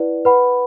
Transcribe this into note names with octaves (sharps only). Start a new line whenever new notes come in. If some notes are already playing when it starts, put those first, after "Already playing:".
Already playing: E4 B4 D5 F#5
B4 F#5 B5